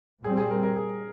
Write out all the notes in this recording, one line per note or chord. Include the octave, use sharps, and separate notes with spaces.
A#2 G3 C4 G#4
G#4
A#4
A#4
G#4